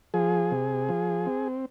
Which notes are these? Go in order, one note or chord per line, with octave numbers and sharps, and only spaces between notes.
F3 G#4
C3
F3
C4